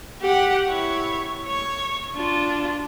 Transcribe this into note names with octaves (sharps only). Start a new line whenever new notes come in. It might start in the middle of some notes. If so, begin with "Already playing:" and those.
G4 F#5
E4 C#5
C#5
D4 F4